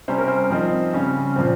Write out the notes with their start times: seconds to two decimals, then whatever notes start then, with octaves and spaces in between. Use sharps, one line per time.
0.08 C3 G3 C#4 C5
0.18 A#4
0.28 C5
0.50 F3 C4 D#4
0.94 C#3 G3 C#4
1.36 A#2 F3 C4